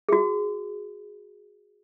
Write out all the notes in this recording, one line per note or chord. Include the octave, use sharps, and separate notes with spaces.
F#4 G#4